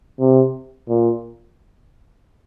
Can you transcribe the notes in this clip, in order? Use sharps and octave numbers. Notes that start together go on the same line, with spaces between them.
C3
A#2